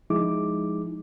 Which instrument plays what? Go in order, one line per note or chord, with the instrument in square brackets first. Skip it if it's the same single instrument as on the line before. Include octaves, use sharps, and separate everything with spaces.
[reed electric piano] F3 G#3 D#4 E4 G#4 D6